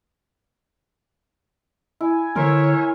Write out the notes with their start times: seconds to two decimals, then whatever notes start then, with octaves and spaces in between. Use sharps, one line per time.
2.01 E4 G#5
2.36 D3 A#4 C5 C#5 E5